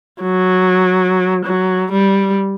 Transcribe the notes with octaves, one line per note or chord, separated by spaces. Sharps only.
F#3
F#3
G3